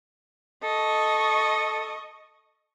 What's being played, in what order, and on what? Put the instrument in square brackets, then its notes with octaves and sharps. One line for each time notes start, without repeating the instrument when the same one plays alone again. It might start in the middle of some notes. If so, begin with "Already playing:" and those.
[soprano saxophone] A4 [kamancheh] D#5 C#6